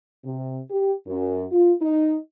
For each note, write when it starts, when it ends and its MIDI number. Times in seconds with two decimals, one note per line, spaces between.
0.25 0.60 48
0.70 0.93 67
1.07 1.44 42
1.52 1.73 65
1.81 2.17 63